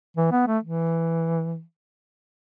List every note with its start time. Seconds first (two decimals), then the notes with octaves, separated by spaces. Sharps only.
0.17 E3
0.32 B3
0.47 A3
0.63 E3